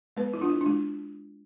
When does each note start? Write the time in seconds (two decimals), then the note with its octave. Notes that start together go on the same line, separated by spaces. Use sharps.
0.17 G#3 B3 B4
0.34 E4
0.41 D4 F4
0.50 E4
0.61 D4
0.66 G#3 E4